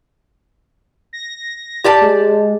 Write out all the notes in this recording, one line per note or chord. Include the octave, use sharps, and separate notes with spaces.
A#6
G4 D5 A5
G#3